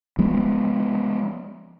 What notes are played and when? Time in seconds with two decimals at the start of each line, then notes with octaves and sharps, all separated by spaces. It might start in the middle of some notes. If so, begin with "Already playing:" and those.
0.18 F3 G#3 B3